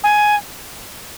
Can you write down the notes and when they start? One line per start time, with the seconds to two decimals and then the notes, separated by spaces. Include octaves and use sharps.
0.03 G#5